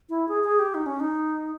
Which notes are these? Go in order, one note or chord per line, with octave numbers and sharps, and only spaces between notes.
E4
G#4
G#4
G4
D#4
C#4
D#4